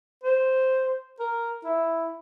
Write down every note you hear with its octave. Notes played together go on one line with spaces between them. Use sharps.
C5
A#4
E4